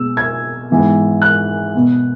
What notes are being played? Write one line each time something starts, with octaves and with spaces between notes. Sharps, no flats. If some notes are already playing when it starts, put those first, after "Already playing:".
Already playing: B2 G#3 B3 E6
G#6
G#2 E3 B3
F#6
B2 B3